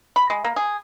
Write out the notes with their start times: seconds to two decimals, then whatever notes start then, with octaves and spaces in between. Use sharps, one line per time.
0.16 B5
0.30 G#3
0.44 A#3
0.56 G#4